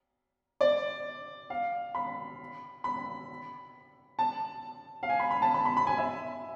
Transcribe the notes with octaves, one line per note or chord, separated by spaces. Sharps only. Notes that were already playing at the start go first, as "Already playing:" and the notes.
D5
F5
B5
B5
A5
F5
G#5
B5
B5
A5
B5
B5
B5
G#5
E5